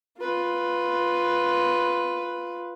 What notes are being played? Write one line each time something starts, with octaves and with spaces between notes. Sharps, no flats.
F4 B4